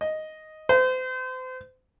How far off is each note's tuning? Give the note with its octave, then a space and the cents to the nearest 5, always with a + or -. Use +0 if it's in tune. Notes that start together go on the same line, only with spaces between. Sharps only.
D#5 +0
C5 -35